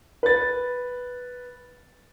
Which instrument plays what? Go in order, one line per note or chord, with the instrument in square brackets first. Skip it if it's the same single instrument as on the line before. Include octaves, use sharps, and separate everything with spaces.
[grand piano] B4 A6